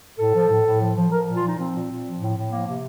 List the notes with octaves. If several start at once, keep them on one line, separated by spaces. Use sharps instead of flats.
A2 A4
F3
A2
A2
F3
F3
F3 A#4
A#2
F4
F3 D#4
F3 C4
A#2
A#2
F3
A2
A2
F3 A#3
C3 A#3